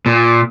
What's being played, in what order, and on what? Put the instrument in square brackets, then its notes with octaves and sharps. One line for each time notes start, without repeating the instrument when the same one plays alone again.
[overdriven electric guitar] A#2